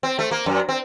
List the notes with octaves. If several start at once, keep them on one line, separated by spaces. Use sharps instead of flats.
C4
A3
A#3
F#2
C4